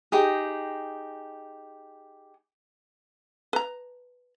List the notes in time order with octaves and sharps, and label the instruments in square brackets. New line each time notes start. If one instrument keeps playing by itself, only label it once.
[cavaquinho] D#4 G4 G#4
[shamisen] B4 A#5